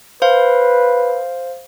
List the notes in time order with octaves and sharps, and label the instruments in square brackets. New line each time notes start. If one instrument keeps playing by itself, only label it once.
[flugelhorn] B4 [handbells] C5 F5